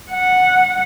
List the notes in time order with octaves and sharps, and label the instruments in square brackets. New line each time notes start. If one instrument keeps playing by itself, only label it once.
[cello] F#5